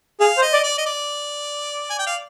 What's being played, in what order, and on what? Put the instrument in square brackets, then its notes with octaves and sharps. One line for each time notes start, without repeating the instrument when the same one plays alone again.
[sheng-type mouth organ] G#4 [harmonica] F5
[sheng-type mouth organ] C5
[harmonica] D#5
[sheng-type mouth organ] D5
[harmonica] D5
D#5
D5
G#5
G5
F5